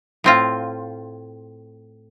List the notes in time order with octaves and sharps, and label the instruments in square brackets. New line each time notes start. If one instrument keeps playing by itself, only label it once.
[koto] A2 C4 F4